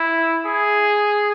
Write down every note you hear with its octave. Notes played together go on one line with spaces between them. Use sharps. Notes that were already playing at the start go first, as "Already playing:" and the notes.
Already playing: E4
G#4